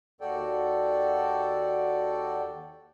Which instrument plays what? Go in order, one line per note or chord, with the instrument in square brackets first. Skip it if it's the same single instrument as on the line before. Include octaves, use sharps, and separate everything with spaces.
[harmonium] D#2 F#4 A4 D5 G5